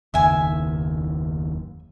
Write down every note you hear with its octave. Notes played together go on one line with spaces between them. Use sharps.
F#1 D#2 E5 G#5